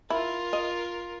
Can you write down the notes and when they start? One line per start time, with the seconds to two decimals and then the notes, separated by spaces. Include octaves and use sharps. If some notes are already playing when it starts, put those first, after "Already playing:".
0.10 E4 F4 A#4
0.53 D#5